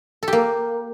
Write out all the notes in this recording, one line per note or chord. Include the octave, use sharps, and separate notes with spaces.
A4
G4
A#3